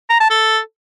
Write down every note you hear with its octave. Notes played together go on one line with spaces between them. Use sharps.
A#5
A5
A4